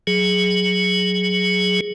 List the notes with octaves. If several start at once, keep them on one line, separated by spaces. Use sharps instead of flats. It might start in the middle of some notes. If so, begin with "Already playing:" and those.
F#3 G#4